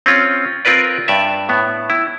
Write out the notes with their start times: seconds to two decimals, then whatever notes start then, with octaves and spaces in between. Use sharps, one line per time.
0.06 C4 C#4 F4
0.65 C4 F4 A#4 B4 D5
1.08 G2 D5 E5
1.49 A2 B3
1.90 E4